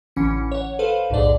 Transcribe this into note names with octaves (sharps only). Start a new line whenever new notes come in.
A1 D3 E3 C#4 C#7
C#5 F#5
A4 B4 C5 F5
B1 E2 A2 D3 D5 D#5